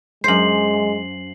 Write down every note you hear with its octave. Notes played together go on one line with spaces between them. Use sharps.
F#2 G#3 C5 C7 F#7